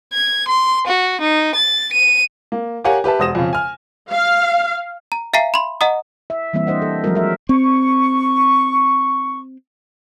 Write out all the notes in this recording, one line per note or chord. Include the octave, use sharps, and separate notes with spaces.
G#6
C6
F#4
D#4
A6
D#7
A#3
G4 A#4 C#5 F5 F#5 G#5
G4 B4 E5 A5
E1 C5 D#6 A#6 E7
F2 C#3
G#5 F6
F5
A#5
E5 F5 G#5 A#5 C7
B5 C6
D#5 F#5 A#5 D#6
E5
E3 G3 A#3 C4 E5
D4 C5 D#5 F#5
A4
F3 F#3 G#3 C4 F#4 A#4
A#4 E5
C4 C#6